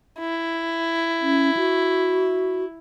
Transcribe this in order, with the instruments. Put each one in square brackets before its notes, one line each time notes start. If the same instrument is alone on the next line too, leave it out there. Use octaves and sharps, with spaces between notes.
[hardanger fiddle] E4
[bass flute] C#4
F#4